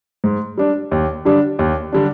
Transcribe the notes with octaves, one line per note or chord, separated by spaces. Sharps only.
G#2
G3 D4
D#2
D3 G3 D4
D#2
D3 G3 D4